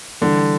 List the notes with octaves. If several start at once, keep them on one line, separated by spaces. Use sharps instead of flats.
D3 E3 G3